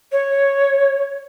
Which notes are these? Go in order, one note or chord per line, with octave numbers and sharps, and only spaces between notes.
C#5